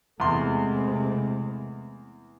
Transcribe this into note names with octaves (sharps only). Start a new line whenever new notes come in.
E2 C3 G#3 A3 C6